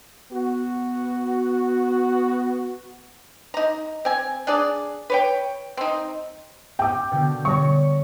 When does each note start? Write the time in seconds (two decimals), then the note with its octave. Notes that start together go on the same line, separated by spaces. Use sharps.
0.32 B3 F#4
3.54 D#4 A#5
4.05 C4 G#5
4.47 D4 G#4 D5
5.10 B4 C#5 G5
5.77 C4 D#4
6.79 G5 D6
7.11 B2 D3
7.45 G3 C#5 C#6 A#6